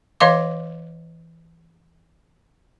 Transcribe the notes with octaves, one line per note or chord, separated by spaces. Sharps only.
E3 C#5 D#5 F5 C6 D6